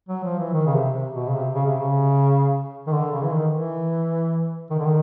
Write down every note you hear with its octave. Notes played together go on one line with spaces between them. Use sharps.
F#3
F3
E3
D#3
C#3
C3
C3
B2
C#3
C3
C#3
C3
C#3
D#3
D3
C#3
E3
D#3
E3
D#3
D3
D#3